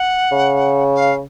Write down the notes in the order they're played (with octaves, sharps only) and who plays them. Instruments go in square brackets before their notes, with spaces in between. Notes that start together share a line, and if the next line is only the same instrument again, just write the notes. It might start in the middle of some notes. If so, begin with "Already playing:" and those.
Already playing: [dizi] F#5
[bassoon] C#3
[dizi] F5